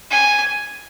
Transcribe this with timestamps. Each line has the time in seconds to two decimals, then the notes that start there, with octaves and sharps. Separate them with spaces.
0.11 G#5